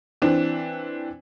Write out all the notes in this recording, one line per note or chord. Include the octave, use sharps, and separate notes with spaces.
E3 C4 D4